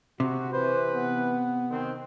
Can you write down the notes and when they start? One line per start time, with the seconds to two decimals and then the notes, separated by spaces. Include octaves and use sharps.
0.20 C3 F#4
0.53 E3 B4 C5
0.91 B3
1.70 D#3 C4